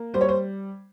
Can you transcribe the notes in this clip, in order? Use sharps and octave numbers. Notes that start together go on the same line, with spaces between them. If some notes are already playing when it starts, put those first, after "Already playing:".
Already playing: A#3
G3 C5
C#5
C5